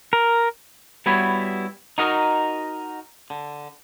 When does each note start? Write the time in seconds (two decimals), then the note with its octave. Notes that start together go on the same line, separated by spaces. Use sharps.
0.13 A#4
1.06 G3 B3 E4 F#4 B4 C#5
1.98 D#4 F#4 A#4 D#5
3.30 D3